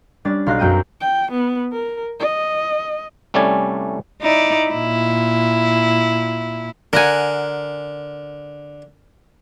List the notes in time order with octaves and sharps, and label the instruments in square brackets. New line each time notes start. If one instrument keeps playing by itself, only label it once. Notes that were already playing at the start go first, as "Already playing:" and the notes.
[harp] G3 C#4 D4 A6
B1 F5 C6 F#6 A#6
F#2 C4 G5 A#5 D#7
[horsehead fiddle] G5
B3
A#4
D#5
[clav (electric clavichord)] C2 G3 A3 C#4 D5 G#5
[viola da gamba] D#4 E4 D5
A#2 E4
[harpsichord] D3 [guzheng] A#4 F#5 G#5